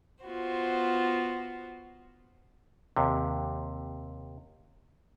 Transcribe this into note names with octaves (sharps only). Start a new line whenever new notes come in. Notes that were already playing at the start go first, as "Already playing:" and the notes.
B3 F4 F#4 C5
D#2 C3